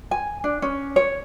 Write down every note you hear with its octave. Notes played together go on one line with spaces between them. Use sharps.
G#5
D4
C#4
C#5